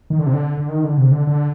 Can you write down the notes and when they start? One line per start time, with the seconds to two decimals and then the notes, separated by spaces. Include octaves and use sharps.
0.10 D#3
0.19 D3
0.26 C3
0.34 D3
0.57 D3
0.69 D#3
0.84 D3
0.98 C3
1.12 D3
1.27 D3